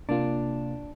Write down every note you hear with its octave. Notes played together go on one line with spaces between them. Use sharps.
C3 A#3 D4 F4